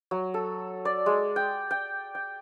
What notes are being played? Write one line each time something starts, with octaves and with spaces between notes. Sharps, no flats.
F#3
A4
D5
G#3
G5
G5
G5